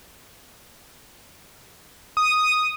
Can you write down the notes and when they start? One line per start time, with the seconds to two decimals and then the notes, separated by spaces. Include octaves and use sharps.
2.17 D#6